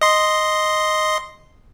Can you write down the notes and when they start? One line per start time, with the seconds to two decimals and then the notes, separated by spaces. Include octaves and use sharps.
0.02 D#5 C6